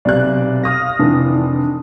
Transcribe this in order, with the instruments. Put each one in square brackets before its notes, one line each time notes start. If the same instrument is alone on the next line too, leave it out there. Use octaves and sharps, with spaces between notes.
[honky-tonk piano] B1 C3 F#6 [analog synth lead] D5
[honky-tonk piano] F5 D#6 F6 [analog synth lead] A#6
[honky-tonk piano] F1 D#3 E3 [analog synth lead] D4